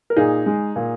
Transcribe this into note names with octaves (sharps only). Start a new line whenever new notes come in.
A#4
A#2 D#4 G#4
G#3
A#2